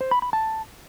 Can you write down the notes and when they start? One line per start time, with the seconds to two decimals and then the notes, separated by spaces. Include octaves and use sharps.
0.01 C5
0.11 B5
0.22 B5
0.33 A5